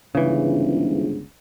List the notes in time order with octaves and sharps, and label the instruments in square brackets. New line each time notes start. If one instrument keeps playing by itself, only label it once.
[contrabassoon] G1 [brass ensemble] C#2 G#2 [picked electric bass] C#3 E3